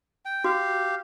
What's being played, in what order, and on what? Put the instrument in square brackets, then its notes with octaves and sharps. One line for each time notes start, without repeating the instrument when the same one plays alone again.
[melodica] G5
[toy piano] F#4 [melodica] G4 F5